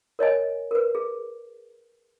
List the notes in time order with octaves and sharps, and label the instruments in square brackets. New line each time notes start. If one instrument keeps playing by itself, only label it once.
[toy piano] A#4 C#5 D#5 G#5
A#4 B4
G#4